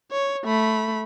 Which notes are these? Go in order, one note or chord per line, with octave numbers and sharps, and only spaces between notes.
C#5
A3 B5